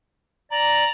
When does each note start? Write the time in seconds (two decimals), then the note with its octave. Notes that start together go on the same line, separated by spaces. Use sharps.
0.51 D5 A#5